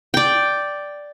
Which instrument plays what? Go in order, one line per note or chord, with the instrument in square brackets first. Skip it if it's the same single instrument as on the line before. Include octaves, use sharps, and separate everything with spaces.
[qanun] D5 G5